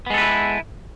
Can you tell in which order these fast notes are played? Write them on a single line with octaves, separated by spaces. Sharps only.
B3 G#3 A4 B4 E4